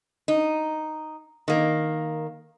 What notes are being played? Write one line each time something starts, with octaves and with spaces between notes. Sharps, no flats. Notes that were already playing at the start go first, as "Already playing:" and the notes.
D#4
D#3 A#3